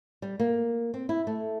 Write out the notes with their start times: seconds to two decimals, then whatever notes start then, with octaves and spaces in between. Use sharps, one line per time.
0.22 G3
0.39 A#3
0.94 C4
1.09 E4
1.27 A3